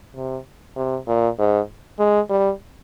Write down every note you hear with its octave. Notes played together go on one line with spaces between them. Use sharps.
C3
C3
A#2
G#2
G#3
G3